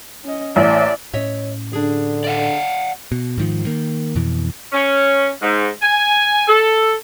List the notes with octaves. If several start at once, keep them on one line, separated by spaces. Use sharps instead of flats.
C#4 D#5
A1 D5 E5
A2 C#4 C#5 D#5 E5
D3 D4 G#4
D5 F5 F#5
B2
G#2 D#3 F3
D#3 A#3
F2 B2 E3
C#4
G#2
G#5
A4